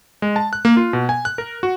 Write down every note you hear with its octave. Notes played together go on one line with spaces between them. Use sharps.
G#3
A5
F#6
A#3
F4
B2
G#5
F#6
A#4
F#4